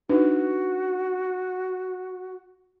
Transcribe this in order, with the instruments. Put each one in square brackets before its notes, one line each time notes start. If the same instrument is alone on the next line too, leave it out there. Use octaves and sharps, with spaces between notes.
[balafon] D4 D#4 B4 [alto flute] F#4